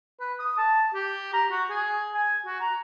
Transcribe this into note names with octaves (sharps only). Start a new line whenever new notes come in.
B4
D#6
A5
G4
A#5
F#4
G#4
G#5
F#4
A#5